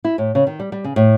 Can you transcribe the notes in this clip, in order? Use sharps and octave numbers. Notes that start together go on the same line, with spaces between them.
E4
A2
C#3
D#3
G3
G3
C#3
A2